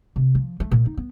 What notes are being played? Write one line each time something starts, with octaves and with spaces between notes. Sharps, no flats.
C3
F3
A3
A#2
D#4
B3